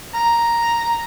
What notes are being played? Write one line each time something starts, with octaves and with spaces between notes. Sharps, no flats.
A#5